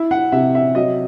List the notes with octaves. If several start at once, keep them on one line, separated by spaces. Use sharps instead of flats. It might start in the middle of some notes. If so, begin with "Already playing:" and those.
Already playing: E4 E5
F#5
C3 E5
E5
F#3 D#5